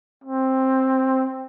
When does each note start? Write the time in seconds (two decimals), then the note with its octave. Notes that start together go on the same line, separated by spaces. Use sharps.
0.24 C4